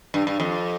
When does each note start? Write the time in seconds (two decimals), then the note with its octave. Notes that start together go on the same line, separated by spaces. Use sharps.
0.14 G2
0.27 G2
0.40 F2